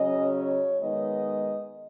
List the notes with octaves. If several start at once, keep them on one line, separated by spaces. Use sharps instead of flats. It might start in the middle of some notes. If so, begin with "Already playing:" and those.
Already playing: C#3 F#3 C#4 D#5
C#5
D#3 G#3 B3 D#4 D#5